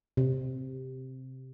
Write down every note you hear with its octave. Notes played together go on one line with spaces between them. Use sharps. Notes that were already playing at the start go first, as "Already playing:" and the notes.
C3